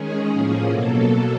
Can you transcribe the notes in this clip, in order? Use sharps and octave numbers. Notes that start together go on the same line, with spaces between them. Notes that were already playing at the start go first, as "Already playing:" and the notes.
Already playing: D#3 G#3 C#4 G#4
A2 F3 A#3 C#4
B2 F#3 A#3 A4